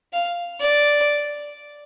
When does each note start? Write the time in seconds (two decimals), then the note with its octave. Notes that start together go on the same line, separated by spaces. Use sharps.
0.13 F5
0.61 D5